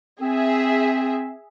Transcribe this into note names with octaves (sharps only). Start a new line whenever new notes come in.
C4 G#4 E5